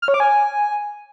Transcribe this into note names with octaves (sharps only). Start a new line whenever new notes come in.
F6
C#5
D6
G#5